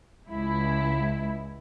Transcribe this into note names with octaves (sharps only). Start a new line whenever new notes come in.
C#2 E4